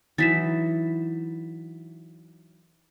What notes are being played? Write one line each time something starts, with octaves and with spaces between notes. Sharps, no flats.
E3 F#3 D#4 A6 B6 E7